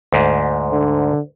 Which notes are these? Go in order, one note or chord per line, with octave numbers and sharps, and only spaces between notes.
D2 G#2
D3